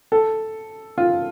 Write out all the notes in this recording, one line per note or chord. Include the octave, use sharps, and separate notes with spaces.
A4
F4